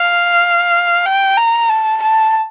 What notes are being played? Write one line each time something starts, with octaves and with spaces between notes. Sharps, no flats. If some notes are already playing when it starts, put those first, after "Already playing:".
Already playing: F5
G5
A#5
A5
A5